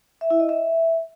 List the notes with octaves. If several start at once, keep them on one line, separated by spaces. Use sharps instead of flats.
E5
E4
D#5
E5